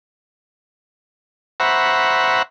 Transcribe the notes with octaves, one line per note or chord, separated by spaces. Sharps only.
C5 E5 F#5 A#5 B5 C#6